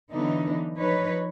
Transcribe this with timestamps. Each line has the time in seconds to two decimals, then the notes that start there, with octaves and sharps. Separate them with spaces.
0.12 D3 E3 F#3 B3 D4 D#4
0.78 F3 D#4 B4 C#5